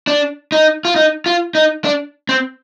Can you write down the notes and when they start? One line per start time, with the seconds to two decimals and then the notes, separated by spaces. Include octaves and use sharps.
0.07 D4
0.52 D#4
0.85 F4
0.96 D#4
1.26 F4
1.55 D#4
1.84 D4
2.29 C4